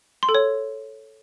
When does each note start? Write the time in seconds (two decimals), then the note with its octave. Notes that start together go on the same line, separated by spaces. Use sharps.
0.23 C6
0.29 A4
0.35 C#5